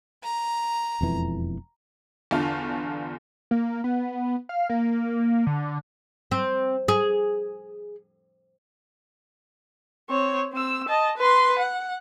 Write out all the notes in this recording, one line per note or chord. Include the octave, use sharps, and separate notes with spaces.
A#5
E1 F2 E3
G1 E2 D3 F4 A5
A#3
B3
F5
A#3
D3
C4
G#4
C4 C#5
C4 E6
D#5 A5
B4 C6
F#5